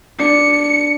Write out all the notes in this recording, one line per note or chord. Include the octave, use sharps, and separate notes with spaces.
D4 C#7